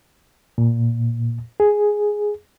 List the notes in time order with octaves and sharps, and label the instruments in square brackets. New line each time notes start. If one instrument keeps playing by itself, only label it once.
[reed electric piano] A#2
G#4